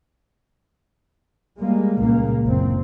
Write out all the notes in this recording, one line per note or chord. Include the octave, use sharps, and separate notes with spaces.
G3 G#3 A#3
C#2 A#2 C#3 A#3
F#1 A2 C4